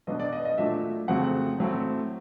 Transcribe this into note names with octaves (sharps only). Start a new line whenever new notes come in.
B2 F#3 B3 D4 D#5
D5
D#5
D#5
A#2 F#3 A3 D4 E5
F2 C#3 F#3 A3 C4 F#5
A2 F#3 A3 C4